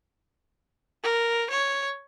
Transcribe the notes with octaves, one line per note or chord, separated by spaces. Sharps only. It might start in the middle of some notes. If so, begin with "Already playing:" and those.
A#4
C#5